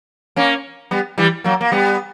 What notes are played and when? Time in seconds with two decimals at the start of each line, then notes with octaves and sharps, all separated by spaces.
0.36 A#3 C#4
0.91 G3 B3
1.18 E3 G3
1.44 F#3 A#3
1.61 A#3
1.72 G3 B3